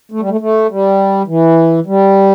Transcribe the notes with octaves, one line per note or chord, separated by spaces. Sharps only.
A3
G3
A3
A3
G3
E3
G3